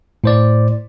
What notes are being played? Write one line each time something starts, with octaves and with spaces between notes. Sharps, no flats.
A2 C5 D5